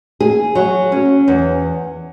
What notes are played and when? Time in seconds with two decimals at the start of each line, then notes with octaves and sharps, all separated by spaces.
0.20 G#4
0.55 F#3
0.92 C#4
1.28 E2